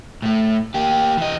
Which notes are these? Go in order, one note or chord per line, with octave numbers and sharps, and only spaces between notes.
A2 A3
A#3 G4
E3 D#5